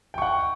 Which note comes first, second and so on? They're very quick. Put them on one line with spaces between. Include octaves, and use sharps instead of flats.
G5 C#6 F#5